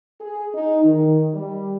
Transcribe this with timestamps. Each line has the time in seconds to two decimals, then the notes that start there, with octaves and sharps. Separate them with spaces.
0.21 G#4
0.54 D#4
0.84 D#3
1.33 G3